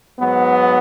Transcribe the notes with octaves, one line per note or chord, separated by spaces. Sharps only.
G#2 F#3 B3